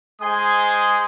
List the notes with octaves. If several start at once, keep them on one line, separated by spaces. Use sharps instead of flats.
G#3 G#4 C5 G#5 C6 D#6